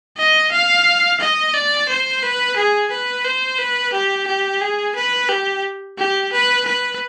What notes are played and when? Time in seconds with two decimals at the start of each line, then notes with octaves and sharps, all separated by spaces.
0.17 D#5
0.52 F5
1.20 D#5
1.54 D5
1.89 C5
2.23 B4
2.56 G#4
2.91 B4
3.24 C5
3.58 B4
3.93 G4
4.27 G4
4.61 G#4
4.95 B4
5.29 G4
5.98 G4
6.32 B4
6.66 B4